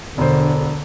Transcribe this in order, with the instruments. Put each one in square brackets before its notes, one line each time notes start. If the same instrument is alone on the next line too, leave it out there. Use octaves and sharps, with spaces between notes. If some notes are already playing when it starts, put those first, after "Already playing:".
[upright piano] E1 C5 [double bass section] D3